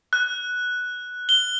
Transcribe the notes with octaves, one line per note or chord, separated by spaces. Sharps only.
F#6
G7